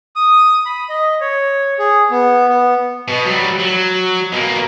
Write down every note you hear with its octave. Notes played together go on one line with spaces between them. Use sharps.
D#6
B5
D#5
C#5
G#4
B3
B3
B2
F#3 G3
F#3
B2 A#3